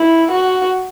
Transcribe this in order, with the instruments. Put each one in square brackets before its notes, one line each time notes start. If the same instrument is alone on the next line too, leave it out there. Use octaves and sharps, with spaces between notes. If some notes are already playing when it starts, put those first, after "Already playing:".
Already playing: [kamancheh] E4
F#4